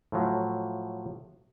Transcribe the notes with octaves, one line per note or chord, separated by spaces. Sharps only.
A2 F3 F#3